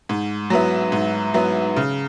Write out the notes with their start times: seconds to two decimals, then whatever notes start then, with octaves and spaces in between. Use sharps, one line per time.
0.09 G#2
0.50 F#3 B3 E4
0.92 G#2
1.34 F#3 B3 E4
1.76 C#3